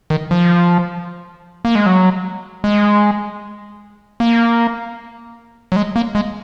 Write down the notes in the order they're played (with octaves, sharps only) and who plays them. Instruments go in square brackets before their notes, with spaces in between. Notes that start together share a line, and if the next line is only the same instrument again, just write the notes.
[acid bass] D#3
F3
A#3
G#3
F#3
G#3
A#3
F#3
G#3
A#3
G#3